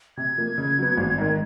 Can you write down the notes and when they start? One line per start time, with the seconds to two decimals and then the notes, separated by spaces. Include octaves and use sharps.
0.17 C3 G#6
0.37 F3 A#3
0.58 C#3
0.78 F#3 B3
0.97 G#1
1.18 G#2 D#3